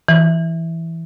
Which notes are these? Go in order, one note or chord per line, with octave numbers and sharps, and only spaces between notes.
E3